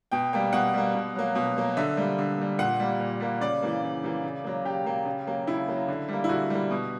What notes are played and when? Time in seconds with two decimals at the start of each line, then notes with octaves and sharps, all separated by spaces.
0.12 B2 G5
0.33 G3 A#3 G5
0.53 B2 F#5
0.73 G3 A#3
0.94 B2
1.16 F#3 A#3
1.35 B2
1.57 F#3 A#3
1.77 D3 E5
1.97 G3 A#3
2.18 D3
2.38 G3 A#3
2.58 A#2 F#5
2.80 G3 A#3
3.00 A#2
3.20 G3 A#3
3.41 C#3 D5
3.63 E3 A#3
3.82 C#3
4.04 E3 A#3
4.24 C#3
4.44 F#3 A#3
4.65 C#3 G4
4.85 F#3 A#3
5.05 C#3
5.27 F#3 A#3
5.47 C#3 E4
5.68 F#3 A#3
5.88 D3
6.09 G3 A#3
6.24 E4
6.29 D3 F#4
6.50 G3 A#3
6.71 B2